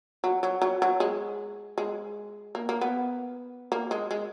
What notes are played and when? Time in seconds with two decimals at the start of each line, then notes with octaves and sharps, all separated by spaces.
0.24 F#3
0.43 F#3
0.62 F#3
0.82 F#3
1.00 G#3
1.78 G#3
2.55 A#3
2.69 A#3
2.81 B3
3.72 A#3
3.91 G#3
4.11 G#3